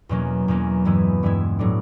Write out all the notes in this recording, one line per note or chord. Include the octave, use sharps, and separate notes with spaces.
E2 B2 F#3 A#3 C#4
E2 B2 F#3 A#3 C#4
G2 E3 G#3 B3 E4
G2 E3 G#3 B3 E4
A2 F#3 A3 D4